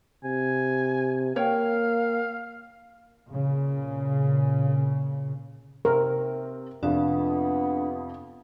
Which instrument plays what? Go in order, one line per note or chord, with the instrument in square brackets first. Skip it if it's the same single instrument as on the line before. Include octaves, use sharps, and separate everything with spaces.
[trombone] C3 [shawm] G#5
[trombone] A#3 [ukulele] C#5 G5 [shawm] F5
[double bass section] A#2 C#3
[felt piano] C3 C4 [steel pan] A#4
[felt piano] F2 C3 F3 [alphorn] B3 [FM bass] D4